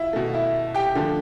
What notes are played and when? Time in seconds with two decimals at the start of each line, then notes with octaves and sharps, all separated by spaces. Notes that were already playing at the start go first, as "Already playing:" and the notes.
Already playing: E4 F4 E5
0.13 B2 A3
0.34 E4 E5
0.74 G4 G5
0.95 D3 F3 A3